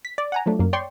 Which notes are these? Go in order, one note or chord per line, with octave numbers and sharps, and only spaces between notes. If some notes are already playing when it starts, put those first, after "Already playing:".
B6
D5
F#5 G#5 A#5
F3 F#3 A3 D4
F#2 A#3
C#5 D5 G5 C6 C#6